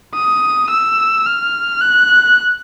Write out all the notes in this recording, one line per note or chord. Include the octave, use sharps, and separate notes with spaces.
D#6
E6
F6
F#6